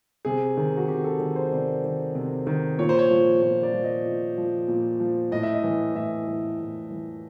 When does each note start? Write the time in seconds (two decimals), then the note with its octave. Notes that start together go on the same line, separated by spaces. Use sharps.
0.25 C3 G#4
0.57 D#3
0.77 F#4
0.88 C3 G4
1.04 A4
1.20 D#3
1.36 C5
1.52 C3 D5
1.84 D#3
2.15 C3
2.47 D#3
2.79 A#2 C#5
2.89 C5
2.99 C#5
3.11 F3
3.42 A#2 C#5
3.63 D5
3.74 F3
3.84 D#5
4.05 A#2
4.38 F3
4.68 A#2
5.00 F3
5.32 A2 D#5
5.43 E5
5.54 D#5
5.64 E3
5.95 A2 E5
6.27 E3
6.59 A2
6.91 E3